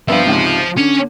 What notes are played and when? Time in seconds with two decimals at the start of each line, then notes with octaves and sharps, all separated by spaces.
0.08 G2 F3 B3 E5 F5
0.25 C#2 G#2 C3
0.77 D3 C#4